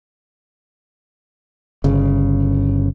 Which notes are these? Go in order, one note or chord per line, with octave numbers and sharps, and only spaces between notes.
G1 C#3